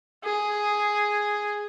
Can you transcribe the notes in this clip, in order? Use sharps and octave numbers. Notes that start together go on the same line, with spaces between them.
G#4